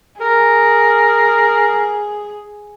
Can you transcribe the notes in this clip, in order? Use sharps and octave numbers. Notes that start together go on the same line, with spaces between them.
G#4 A#4